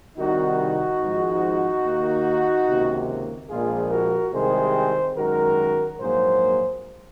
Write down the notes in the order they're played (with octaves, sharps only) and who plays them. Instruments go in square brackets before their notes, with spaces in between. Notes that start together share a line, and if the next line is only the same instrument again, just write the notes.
[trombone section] C2 C3 D#3 D#4 F#4
G#1 G#2 F3 G#3
D#2 D#3 A#3
C#2 C3 D#3 A#3
A#1 A#2 F3 G#3 F4 G#4
F#4 A#4
C2 C3 D#3 G#3 C4 G#4 C5
F#2 D#3 G#3 F#4 A#4
A#1 G#2 F#3 A#3 G#4 C5